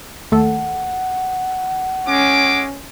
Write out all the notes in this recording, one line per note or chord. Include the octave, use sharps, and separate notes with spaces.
D#2 A3 A4 F#5
G#3 C#4 D6